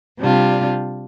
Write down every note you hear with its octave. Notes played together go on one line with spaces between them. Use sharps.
C3 G3 D4 F4